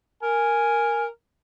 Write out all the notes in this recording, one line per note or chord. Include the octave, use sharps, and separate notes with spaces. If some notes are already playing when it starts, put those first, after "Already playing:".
A#4 G#5